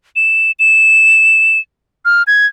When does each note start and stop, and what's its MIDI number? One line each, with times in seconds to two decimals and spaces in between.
0.16 0.52 100
0.59 1.59 100
2.05 2.23 89
2.27 2.46 92